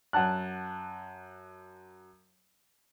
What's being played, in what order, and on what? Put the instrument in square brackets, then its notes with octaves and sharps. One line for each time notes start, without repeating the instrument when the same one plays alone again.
[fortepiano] F#2 F#5 A5 F#6